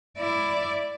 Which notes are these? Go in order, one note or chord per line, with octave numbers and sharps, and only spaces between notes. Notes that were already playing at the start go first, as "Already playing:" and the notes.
E4 D5